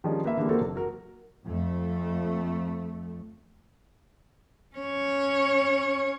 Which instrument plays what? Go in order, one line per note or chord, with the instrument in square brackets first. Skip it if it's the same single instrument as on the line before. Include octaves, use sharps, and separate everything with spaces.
[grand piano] D#3 F3 G3 G#3 C#4 D4
A#3 B4 E5
D3 E3 G3 G#3 A#3
A#3 C4 F#4 A4 A#4 C5
F#1
F#4 A#4
[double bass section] F2 A3
[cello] C#4 C#5